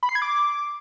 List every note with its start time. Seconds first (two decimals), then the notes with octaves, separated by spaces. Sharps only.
0.03 B5
0.09 C7
0.15 G#6
0.22 D6